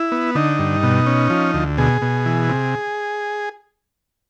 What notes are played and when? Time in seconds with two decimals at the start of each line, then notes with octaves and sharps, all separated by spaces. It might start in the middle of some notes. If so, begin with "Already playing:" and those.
Already playing: E4
0.12 B3
0.35 D3 D#4
0.59 G2
0.83 B2
1.06 C#4
1.30 F3
1.54 D2
1.78 B2 G#4
2.02 B2
2.26 E3
2.49 C3